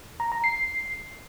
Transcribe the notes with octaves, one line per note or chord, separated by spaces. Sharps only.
A#5
A#5
C7